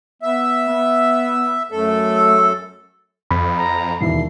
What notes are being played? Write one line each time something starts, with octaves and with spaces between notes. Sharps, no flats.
B3 E5
B3
F#2 A3 A4
E6
F2 B5
A#5
E1 D#2 E4 C7